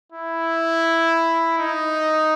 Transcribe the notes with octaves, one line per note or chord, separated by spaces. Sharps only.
E4
D#4